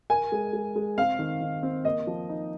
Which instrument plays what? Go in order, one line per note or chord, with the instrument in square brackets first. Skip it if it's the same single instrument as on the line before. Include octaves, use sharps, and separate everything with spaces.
[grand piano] A#4 [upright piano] G#5
[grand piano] G#3
G#3
G#3
[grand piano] C4 [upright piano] F5
[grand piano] D#3
D#3
C4
[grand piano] A#3 [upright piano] D#5
[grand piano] F3
D#4